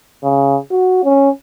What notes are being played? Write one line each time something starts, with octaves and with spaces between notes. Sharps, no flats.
C#3
F#4
C#4